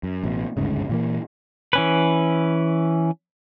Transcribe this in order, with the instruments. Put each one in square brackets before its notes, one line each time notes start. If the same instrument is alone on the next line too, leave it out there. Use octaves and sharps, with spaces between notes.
[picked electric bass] F#2
A1 B2
G1 D2 G#2 C#3
A#2 E3 A#3
[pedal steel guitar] E3 C#4 B4